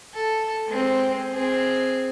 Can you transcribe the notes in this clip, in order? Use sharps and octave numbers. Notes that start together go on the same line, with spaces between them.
A4
G#3 C4
C4 G#4